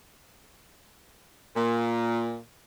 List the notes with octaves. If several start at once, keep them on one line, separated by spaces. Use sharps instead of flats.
A#2